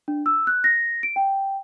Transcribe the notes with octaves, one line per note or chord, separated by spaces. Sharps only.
D4
E6
F#6
A#6
D7
G5